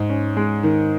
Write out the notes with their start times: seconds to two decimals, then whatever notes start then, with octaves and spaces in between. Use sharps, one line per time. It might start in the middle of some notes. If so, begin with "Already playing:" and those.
Already playing: G#2
0.09 C#4
0.37 G#3
0.63 D#3